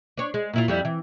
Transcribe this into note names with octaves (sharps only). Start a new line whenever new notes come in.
D4 C#5
G#3
A#2 E4 F4
F2 G3 E4
E3